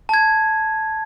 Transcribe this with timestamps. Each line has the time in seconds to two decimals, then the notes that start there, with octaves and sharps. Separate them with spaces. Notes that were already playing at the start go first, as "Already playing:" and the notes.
0.09 A5 G#6